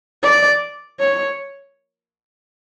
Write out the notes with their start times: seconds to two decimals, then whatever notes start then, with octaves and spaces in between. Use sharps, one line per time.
0.23 D5
1.00 C#5